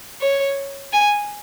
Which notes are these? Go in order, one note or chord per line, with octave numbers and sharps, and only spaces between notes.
C#5
G#5